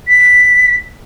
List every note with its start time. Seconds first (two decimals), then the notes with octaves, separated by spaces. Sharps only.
0.08 B6